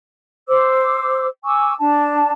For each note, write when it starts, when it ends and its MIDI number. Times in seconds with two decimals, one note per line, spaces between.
0.48 1.27 72
0.48 1.27 86
0.48 1.27 88
1.45 1.74 80
1.45 1.74 85
1.45 1.74 86
1.45 1.74 88
1.79 2.31 62
1.79 2.31 81